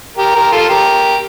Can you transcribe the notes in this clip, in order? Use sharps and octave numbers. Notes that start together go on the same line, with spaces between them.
G4 A#4
G4 A#4
F4 A4
G4 A#4